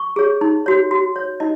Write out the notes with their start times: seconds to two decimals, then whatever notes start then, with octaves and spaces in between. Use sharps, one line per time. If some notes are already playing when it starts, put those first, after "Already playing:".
Already playing: C#6
0.16 G#4 C#5
0.41 D#4
0.66 F#4 C#5
0.91 F#4
1.16 C#5
1.40 D#4 D#5